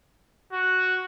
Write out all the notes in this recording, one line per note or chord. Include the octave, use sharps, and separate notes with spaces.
F#4